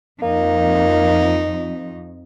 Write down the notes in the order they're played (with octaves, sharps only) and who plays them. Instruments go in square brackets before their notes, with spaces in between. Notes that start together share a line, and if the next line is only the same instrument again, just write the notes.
[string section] F2 [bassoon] A#3 [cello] D#4